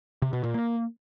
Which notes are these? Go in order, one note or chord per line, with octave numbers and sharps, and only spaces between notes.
C3
B2
A#2
A#3